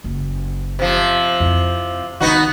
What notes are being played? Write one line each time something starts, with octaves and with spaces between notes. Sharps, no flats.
F#1
C3 F3
F2 E4
C2 D#3 B3 D#4 F#4